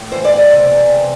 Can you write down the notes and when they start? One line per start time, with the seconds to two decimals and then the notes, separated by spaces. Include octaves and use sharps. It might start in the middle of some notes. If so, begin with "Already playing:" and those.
Already playing: A2
0.12 E3 C5
0.24 D5
0.32 A2
0.37 D#5
0.50 C3 D5
0.70 E2
0.89 C3